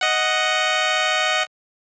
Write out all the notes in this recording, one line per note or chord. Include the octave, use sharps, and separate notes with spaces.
D#5 F#5